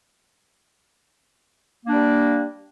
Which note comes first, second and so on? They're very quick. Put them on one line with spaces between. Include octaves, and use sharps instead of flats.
A#3 D4 G3